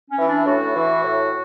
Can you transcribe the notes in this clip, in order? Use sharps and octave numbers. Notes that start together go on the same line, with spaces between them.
C#4
E3
D4
A2 F#4
E3
A2